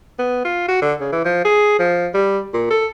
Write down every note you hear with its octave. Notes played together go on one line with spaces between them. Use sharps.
B3
F4
F#4
D3
C#3
E3
F3
G#4
F3
G3
A#2
A4